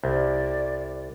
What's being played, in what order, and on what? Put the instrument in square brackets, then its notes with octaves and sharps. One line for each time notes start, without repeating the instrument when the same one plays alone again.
[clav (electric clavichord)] C2 [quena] D5